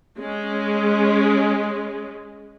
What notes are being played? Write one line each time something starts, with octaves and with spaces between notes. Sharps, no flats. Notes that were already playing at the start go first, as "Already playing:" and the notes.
G#3 C#4